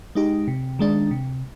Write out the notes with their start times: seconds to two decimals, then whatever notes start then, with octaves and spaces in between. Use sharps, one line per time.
0.15 G#3 D#4 G4
0.48 C3
0.79 D#3 G#3 D4
1.11 C3